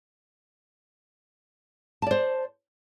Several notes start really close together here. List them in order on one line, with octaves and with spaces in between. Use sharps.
A5 D5 C5